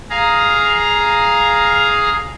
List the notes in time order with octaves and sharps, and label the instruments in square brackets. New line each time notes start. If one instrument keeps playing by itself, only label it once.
[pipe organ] G#4 F5 A#5